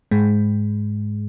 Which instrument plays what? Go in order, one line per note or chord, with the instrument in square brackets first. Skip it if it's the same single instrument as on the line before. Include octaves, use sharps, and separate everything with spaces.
[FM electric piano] G#2 G#3